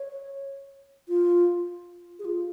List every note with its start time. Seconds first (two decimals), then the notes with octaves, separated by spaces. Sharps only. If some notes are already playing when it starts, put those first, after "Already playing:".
Already playing: C#5
1.09 F4
2.19 G#4
2.25 F4